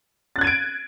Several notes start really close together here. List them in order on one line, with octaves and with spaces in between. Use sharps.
A6 F#6 G#6 D#7 D7